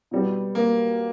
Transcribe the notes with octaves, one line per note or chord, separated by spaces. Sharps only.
B2 G3 B3
A#3